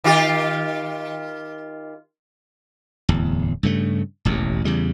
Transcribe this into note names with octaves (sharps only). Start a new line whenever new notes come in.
D#3 F4 G4
D1 E2
G2 C#3 A3
E1 A1 D#2
E2 C#3 G3